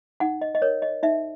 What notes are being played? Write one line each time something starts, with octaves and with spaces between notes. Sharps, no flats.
D#4 F#5
D#5
D#5
A#4 C#5
D#5
D#4 E5